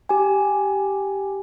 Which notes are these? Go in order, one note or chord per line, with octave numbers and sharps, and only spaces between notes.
G4 G#5